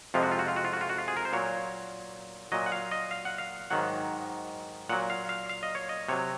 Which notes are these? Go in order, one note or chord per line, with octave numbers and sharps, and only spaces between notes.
F2 C3 F3 G#3 F4
F#4
F4
F#4
F4
F#4
F4
F#4
F4
F#4
F4
G#4
A#4
C5
A#2 F#3 C#5
A#2 F#3 D#5
F#5
F5
D#5
F5
F#5
F5
G#2 D#3 F#3 F#5
A#2 F#3 F#5
F5
F5
F5
D#5
C#5
D#5
C3 F#3 C#5